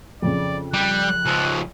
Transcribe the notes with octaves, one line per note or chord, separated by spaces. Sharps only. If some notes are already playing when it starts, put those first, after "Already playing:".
F2 C#3 D5
G3 F#6
C#2 F3